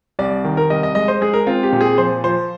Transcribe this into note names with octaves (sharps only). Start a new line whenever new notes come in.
C2 D5
D#3
A#4
C2 D#5
D#5
G#3 D#5
C5
G#3 G#4
A#4
C4 F4
G4
A#2
G#4
F3 C5
F3 C5